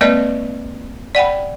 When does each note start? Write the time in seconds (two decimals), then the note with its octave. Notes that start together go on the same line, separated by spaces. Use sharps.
0.01 G#3 A#3 C4 B4 D5 D#5
1.15 D5 F#5 G5 B5